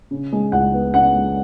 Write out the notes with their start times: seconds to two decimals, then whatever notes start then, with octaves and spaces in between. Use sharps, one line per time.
0.11 C#3
0.32 G#3
0.52 C#2 F#5
0.74 B3
0.94 C#3 F#5
1.14 G#3